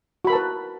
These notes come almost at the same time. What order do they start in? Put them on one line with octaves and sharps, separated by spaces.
F#4 B5 A#4 A5 B4